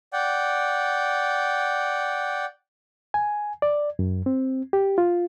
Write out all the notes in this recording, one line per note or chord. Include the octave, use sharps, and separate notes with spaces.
D5 F#5 G5
G#5
D5
F#2
C4
G4
F4